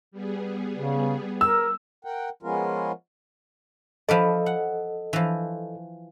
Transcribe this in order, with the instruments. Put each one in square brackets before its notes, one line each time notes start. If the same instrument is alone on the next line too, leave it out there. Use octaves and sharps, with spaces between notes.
[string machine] G3 B3 G#4
[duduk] C#3
[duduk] A#4 [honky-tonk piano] E6
[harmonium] A#4 F#5 G5
F3 G#3 B3 C#4 F4 A#4
[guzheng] F3 B4 D5 [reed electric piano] A4 D#5
[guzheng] F#5
E3 F3